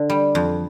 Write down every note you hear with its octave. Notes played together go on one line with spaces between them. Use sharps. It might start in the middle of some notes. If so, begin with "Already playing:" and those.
Already playing: D3
G3
F2